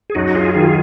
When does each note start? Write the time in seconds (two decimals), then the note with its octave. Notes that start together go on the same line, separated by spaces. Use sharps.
0.10 G#4
0.15 F#2 D#4 F#4
0.35 F4 G#4
0.55 D#3 F#3 F4 G#4